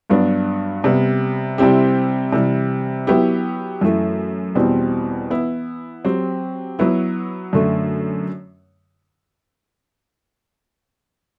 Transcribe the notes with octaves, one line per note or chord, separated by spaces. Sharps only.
G2 F#3 B3 D4
C3 G3 B3
C3 G3 C4 E4 G4
C3 E3 G3
F#3 B3 E4 G4
F#2 E3 A3
E2 B2 G3 C4
E3 B3 E4
F#3 C4 G4
F#3 B3 E4
F#2 D3 A3